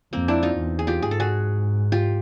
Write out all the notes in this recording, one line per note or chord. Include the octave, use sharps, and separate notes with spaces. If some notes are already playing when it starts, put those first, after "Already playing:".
F2 A#3 C4
D4 E4
D#4 F4
E2
G#4
F4 G4
G#2 G#4
A4
F#4 G#4
F4 G4